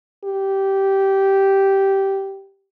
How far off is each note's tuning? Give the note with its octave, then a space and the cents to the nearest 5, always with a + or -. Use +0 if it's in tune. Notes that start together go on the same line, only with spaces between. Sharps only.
G4 -10